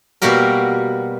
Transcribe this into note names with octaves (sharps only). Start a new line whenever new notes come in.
B2 G3 A#3 F#4 G4 A#4